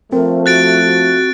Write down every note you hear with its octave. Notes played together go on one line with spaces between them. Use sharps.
F3 A3 C4 A#4
F#4 F#6 A6 D7
F#4